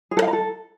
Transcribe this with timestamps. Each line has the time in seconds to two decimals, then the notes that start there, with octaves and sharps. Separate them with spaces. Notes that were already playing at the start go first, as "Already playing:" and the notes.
0.11 G#4
0.17 A4
0.22 F5
0.28 A#5
0.33 A4